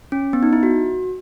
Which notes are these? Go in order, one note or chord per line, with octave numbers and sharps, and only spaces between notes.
C#4
B3
D#4
E4
F#4